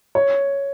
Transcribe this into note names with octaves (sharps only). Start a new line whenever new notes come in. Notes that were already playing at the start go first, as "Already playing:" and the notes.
C#5